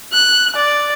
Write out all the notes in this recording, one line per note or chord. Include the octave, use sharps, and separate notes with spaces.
F#6
D5